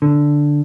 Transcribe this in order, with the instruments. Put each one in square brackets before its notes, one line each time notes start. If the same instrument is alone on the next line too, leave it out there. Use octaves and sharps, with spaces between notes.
[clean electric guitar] D3